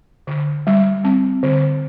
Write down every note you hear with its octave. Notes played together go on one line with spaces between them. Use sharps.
D3
G3
C4
D3